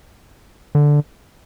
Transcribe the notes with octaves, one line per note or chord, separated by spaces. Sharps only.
D3